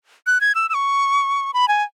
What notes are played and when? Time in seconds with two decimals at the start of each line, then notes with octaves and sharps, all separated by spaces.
0.27 F#6
0.41 G#6
0.55 E6
0.69 E6
0.74 C#6
1.54 B5
1.68 G#5